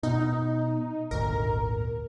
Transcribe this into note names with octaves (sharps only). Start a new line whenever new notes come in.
B2 D#4
G#1 D2 A#2 A#4